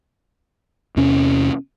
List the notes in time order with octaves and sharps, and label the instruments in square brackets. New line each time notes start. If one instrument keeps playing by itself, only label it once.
[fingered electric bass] E2 C3 C#4